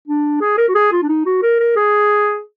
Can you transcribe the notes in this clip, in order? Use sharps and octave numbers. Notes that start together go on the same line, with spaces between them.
D4
G#4
A#4
F#4
G#4
F4
D4
D#4
F#4
A#4
A#4
G#4